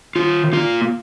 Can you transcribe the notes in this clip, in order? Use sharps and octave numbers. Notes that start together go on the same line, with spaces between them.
D#3 F4
A#3 F4